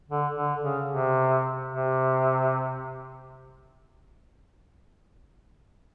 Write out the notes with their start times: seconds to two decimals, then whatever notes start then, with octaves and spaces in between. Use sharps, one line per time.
0.09 D3
0.35 D3
0.62 C#3
0.88 C3
1.68 C3